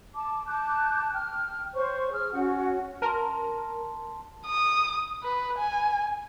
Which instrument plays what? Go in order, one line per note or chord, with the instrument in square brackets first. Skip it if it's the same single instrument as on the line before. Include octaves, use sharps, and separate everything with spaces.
[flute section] A5 D6
A5 D6 F#6 G6
G5 F6
C5 C#5 C#6
G#4 F6
C#4 F#4 F#5
[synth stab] A#4 [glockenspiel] A5 C6
[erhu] D#6
B4
G#5